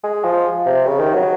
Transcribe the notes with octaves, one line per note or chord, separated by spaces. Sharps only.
G#3
F3
C3
C#3
D#3
F#3